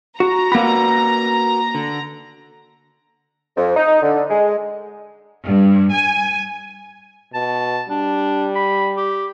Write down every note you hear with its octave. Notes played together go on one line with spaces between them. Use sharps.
F#4 A#5
A#3 F#4 A#4 B4 B5
D3
F2
D#4
D3
G#3
G2
G#5
B2 A5
G3 D4
B5
G4